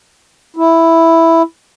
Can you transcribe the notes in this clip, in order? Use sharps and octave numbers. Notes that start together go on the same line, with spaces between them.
E4